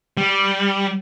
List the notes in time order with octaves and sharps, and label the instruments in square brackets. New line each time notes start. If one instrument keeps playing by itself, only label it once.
[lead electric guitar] G3